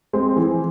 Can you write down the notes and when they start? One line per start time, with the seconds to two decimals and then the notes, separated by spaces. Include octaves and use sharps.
0.13 G#3 C4
0.36 E3